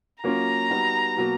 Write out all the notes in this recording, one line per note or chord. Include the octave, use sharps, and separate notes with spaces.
F#3 A#3 C#4 F4 A#5
G3 B3 D#4 F#4
B2 F#3 A#3